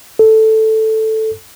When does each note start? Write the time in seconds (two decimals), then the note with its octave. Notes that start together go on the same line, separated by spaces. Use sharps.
0.19 A4